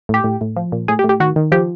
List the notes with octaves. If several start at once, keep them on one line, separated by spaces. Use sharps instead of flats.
A2 G4
A2
A2
F3
A#2
A2 G#4
G4
A2
G4
D#3 F#4
D#3
F3 G4